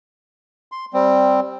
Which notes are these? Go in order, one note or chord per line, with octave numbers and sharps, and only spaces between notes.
C6
G3 C4